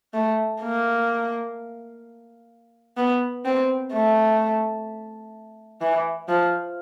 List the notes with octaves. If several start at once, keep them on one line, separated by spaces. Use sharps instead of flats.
A3
A#3
B3
C4
A3
E3
F3